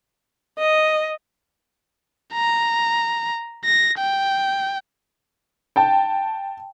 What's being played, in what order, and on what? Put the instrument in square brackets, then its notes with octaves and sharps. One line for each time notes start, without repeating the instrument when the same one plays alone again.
[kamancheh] D#5
[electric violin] A#5
A#6
G5
[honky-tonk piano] G5 A5